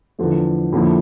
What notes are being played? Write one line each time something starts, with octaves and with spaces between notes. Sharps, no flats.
E2 D3 F3 A3
F2 D3 F3 A#3 E4